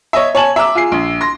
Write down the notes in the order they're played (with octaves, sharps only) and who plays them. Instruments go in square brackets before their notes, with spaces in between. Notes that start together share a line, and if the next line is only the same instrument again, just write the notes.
[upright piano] C#5 D#5 E5
C#5 G#5 A5 F#7
E5 A#5 D6 E6
F4 G#4 C7
A#1
C6 A#6